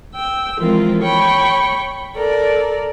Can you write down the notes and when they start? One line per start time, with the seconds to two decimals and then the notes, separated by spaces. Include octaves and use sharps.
0.14 G5 E6
0.58 E3 F3 G#3 C4 F4 A#4
1.03 C#5 G5 B5 C#6
2.15 A4 A#4 D5